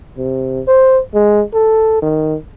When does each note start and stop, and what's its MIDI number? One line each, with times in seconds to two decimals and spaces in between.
0.17 0.61 48
0.67 0.99 72
1.14 1.42 56
1.54 1.98 69
2.02 2.35 51